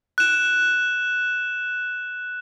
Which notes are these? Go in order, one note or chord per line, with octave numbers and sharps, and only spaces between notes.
F#6 E7